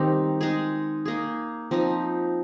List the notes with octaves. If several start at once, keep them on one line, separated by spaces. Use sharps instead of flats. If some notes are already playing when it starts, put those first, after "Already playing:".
Already playing: D#3 G3 C4 D#4
G#3 D#4 G#4
A#3 D#4 G#4
F3 C4 D#4